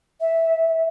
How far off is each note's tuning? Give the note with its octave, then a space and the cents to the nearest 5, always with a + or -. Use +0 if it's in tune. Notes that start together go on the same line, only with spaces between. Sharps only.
E5 -10